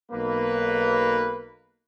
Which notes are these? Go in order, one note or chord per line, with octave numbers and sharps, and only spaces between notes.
B1 A#3 B4